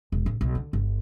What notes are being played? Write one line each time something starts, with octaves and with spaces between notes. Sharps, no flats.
E1
A1
B1
D3
G1